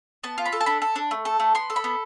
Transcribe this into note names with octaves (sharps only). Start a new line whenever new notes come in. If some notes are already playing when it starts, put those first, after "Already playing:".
B3 A5
F4
B5
A4
A5
D4 B5
A4
D4
A3
A4
A3
B3 C6
A4
B5
B3